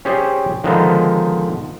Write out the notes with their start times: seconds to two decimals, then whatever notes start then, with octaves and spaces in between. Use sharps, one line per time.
0.05 C#4 G4 G#4 C5 D5
0.64 D3 D#3 F3 G#3 B3 D#4